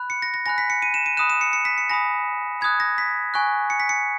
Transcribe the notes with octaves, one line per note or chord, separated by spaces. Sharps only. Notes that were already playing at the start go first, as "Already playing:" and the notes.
Already playing: B5 F#6
C#7
A#6
A#6
G#5 B5 F#6 A#6
B6
C#7
D#7
E7
D#7
B5 D#6 F#6 E7
E7
C#7
C#7
B6
C#7
G#5 B5 D#6 A#6
B5 D#6 F#6 G#6
A#6
B6
G#5 C#6 F#6
C#7
B6
C#7